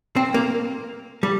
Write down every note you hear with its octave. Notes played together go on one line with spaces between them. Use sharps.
C4
A#3
G3